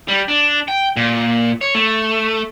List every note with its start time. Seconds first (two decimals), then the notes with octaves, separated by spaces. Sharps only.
0.08 G3
0.28 D4
0.68 G5
0.97 A#2
1.61 C#5
1.75 A3